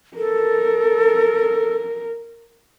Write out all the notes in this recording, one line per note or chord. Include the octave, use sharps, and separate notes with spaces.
A4 A#4